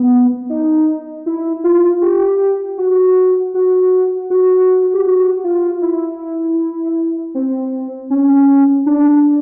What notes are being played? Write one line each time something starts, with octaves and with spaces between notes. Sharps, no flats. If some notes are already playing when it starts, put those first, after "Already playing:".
Already playing: B3
D#4
E4
F4
G4
F#4
F#4
F#4
G4
F#4
F4
E4
C4
C#4
D4